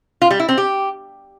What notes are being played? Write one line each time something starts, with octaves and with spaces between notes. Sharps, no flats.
F4
G3
E4
C4
G4